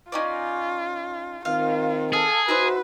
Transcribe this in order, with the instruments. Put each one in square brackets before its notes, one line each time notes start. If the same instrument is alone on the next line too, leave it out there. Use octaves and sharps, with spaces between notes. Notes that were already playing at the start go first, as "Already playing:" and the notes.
[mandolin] C#4 D#4 D5 [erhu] F4
[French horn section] D#3 C4 [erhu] F4 [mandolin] F5
[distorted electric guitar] G#4 [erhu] A4 [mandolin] F5
[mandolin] D#4 E4 C5 [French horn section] F#4 [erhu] B4